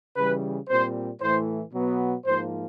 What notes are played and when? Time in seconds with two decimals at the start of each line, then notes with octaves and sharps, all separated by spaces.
0.16 C#3 E3 G3 B4
0.68 A#2 G3 C4 C5
1.21 A2 E3 A3 C5
1.73 B2 F#3 B3
2.25 G#2 F3 A#3 C5